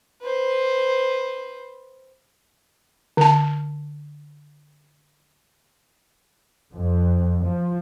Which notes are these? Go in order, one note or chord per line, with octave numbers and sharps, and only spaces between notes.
B4 C5
D3 A5
F2
F3